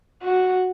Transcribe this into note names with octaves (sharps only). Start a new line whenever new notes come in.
F#4